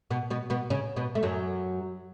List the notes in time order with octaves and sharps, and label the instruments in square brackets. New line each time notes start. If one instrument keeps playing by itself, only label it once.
[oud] B2 B3
B2 B3
B2 B3
C#3 C#4
B2 B3
A3
F#2 F#3